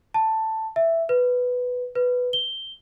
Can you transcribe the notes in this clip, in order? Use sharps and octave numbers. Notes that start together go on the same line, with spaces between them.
A5
E5
B4
B4
G7